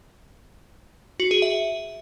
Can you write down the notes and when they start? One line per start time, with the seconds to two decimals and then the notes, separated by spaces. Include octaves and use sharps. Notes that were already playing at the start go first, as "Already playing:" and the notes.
1.20 F#4
1.31 G#4
1.42 E5